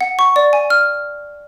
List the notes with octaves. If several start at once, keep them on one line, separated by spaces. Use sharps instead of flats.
F#5
C#6
D5
G#5
F6